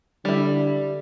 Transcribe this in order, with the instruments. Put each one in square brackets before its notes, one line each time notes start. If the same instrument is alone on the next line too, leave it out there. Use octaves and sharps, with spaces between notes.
[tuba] D3 [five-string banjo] G3 E4